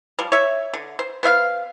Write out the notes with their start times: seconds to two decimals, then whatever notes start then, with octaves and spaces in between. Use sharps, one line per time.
0.19 F3 G3
0.32 C#5 E5
0.74 D3
0.99 C5
1.23 B3 C5 E5 F5